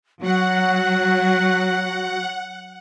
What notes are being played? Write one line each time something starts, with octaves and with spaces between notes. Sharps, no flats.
F#3 F#4 F#5